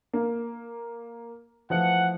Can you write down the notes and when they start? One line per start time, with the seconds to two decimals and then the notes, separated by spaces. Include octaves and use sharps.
0.13 A#3
1.70 E3 F3 A3 F#5